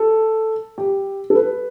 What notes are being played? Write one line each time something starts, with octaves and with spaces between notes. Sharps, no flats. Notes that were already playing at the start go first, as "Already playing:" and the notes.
Already playing: A4
G4
A4
B4